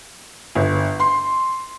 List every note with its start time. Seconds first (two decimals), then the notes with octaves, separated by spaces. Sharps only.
0.55 G1
1.00 C6